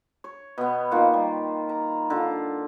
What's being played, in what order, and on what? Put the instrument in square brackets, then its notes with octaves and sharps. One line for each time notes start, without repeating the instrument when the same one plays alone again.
[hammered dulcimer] C#5
B2 B3
D#3 A#3 F4 F#5
G3
A#5
D3 F4